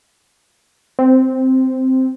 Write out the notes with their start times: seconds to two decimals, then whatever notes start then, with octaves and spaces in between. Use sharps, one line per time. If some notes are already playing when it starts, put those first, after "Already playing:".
0.99 C4